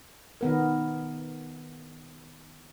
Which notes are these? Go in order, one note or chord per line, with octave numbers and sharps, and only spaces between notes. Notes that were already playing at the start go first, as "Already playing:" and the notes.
D#3 B3 A#4